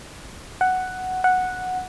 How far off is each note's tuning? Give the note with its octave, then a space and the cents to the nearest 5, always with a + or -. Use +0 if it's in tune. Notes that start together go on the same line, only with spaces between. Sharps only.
F#5 +5
F#5 -5